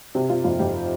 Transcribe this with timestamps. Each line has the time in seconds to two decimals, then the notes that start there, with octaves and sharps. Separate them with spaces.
0.15 C3 G4
0.30 C3 F4
0.44 F2 F4
0.59 F2 G4